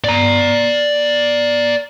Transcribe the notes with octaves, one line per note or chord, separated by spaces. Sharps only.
D5 A#5